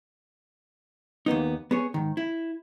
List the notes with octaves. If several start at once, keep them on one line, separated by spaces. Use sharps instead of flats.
D#2 A#3 B3 D#4
B3 G#4 C#5
G#2 D#3
E4